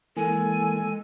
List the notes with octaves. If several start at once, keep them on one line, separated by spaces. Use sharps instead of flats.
E3 G#3 A#3 A4 G#5